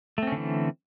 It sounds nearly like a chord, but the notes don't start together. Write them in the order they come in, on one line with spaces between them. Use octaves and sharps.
A3 C4 C#4 D3 E3